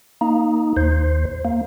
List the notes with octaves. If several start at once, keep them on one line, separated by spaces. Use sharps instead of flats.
A#3 D#4
D#2 C5
A#3